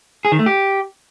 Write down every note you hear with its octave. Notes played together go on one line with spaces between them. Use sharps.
G#4
D#3
A3
G4